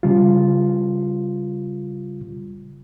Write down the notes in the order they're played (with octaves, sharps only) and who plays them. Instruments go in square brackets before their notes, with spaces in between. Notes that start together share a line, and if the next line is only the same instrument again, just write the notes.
[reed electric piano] C#3 G3 F4